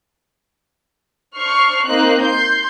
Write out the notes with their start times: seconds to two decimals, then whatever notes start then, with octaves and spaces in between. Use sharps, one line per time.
1.36 D4 C5 C#6 F6 C7
1.85 A#3 C4 D#4 C5 F#6
2.23 C6 G6